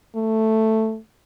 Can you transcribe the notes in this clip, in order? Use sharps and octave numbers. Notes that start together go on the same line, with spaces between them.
A3